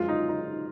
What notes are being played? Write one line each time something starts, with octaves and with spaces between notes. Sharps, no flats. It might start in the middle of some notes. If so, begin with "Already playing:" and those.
Already playing: F#2 F3 G#3 F4
D#4
D#4